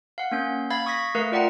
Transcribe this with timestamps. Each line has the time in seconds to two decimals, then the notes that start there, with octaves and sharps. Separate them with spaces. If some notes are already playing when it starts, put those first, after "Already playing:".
0.18 F5 F#5
0.31 A#3 C#4 G6
0.70 F5 B5 G#6 A6
0.86 C#6 D#6 G#6 A#6 B6
1.15 A3 A#4 B4 F5
1.32 F4 D5 F#5 G5 A#5